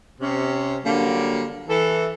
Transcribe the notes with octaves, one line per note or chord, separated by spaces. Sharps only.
C3 C#4
D3 F#3 G3 A#3
E3 A4